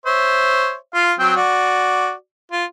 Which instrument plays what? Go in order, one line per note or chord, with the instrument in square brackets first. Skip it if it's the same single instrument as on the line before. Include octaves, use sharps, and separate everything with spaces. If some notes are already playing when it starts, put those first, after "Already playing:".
[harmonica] C5 C#5 E5
F4 F5
F#3 C4 G5
F#4 D5
F4